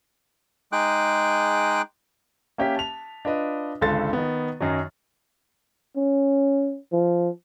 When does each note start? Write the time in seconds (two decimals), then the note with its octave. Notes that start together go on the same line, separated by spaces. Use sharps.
0.72 G#3 D#4 G#4 G5 D6 F#6
2.58 A#3 C#4 G4 E5 B6
2.76 A5 F7
3.25 D4 F4 B4 D#5
3.81 G#1 C#2 D3 A4 C6 A6
4.13 D#3 B3
4.60 F#2 D#3 F#3
5.97 C#4
6.92 F3